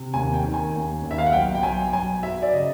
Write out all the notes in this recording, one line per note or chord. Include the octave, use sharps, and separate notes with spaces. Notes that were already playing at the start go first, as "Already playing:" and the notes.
Already playing: C3
D#2 G#5
G5
D#3
G#5
D#2
D#2
E5
F5
F#5
B1 G5
G5
B1 G#5
B1 G#5
F#3 E5
D5
C#3 D#5